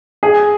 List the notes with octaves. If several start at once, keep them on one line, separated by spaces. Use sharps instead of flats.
G#4